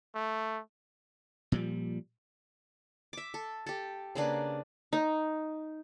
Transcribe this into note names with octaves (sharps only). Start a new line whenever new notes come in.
A3
A#2 F3 G3
E5 D6
A4
G4 A4
C#3 A#3 D4 B4
D#4